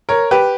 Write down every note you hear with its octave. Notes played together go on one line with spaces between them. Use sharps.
A#4 C#5
G4 B4